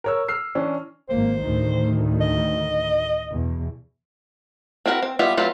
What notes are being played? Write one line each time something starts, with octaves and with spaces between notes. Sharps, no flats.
A#4 C#5 E6
E6 F6 C7
E3 C#4 D4
G#1 A#3 C5
D2 A2 D#3
D#5
E2 B2
C4 D4 F#4 A#4 B4
C4
G3 B3 F4 E5
F#3 A3 C4 F4 B4